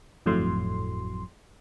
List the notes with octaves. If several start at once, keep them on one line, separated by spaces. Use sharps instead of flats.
G1 F2 A2 F#3 A3 C6